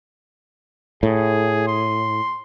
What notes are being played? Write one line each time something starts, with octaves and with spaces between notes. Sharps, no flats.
A2 G#4
C6